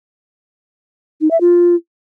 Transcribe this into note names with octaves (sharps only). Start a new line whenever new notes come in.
D#4
E5
F4